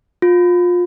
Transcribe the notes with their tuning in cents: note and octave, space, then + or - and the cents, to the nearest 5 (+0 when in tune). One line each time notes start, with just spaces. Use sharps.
F4 +25